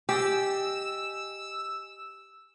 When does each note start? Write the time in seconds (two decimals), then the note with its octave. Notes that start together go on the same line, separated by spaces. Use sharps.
0.09 G4 G#4 D5 D#5 E6